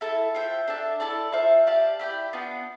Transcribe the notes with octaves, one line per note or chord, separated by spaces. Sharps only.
E4 A4 E5 A5
F4 C5 E5 G5
D4 A4 E5 A5
E4 A4 D5 A5
F4 C5 E5 A5
G4 D5 F5 A5
E4 G4 D5 G5
B3 D4 F4